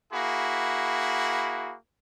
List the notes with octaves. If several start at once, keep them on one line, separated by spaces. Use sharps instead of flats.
A#3 E4 F#4 G#4 B5